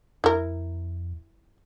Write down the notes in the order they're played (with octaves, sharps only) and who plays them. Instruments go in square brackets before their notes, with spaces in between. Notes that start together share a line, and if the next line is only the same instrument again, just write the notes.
[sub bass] F2 [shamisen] E4 A#4